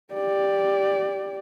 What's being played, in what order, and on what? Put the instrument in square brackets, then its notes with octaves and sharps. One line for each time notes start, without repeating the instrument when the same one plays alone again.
[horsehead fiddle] G4 D5